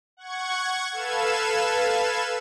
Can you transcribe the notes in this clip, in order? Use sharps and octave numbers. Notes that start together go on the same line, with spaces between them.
F#5 C#6 G#6
A4 B4 F5 G#6 E7